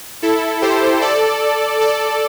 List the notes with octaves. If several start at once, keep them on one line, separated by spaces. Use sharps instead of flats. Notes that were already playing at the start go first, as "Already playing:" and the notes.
E4 A4
G4 C5
A4 D5
A4 D5